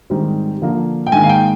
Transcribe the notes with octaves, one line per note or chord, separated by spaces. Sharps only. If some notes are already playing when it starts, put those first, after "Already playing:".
G#2 D#3 G3 C4
D3 F3 A#3
G5
G#2 D#3 A#3 G#5
F5
G5